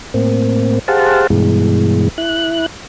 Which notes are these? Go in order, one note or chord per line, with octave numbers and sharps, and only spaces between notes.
A2 A#3 C4
G4 G#4 C5 F5 F#5 A5
G2 B2 E3 G#3
E4 F#6